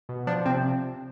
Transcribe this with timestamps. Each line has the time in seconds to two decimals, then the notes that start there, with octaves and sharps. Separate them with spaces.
0.09 B2
0.27 F3 D4
0.46 C3 C4